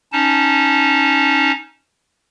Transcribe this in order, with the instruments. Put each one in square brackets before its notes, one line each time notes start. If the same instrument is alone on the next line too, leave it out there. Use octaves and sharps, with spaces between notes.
[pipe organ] C#4 D#4 A5